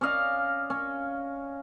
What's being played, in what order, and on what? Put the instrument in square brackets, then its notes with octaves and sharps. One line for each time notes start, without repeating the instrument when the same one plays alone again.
[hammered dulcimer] C#4 D5 D#5 F5
C#4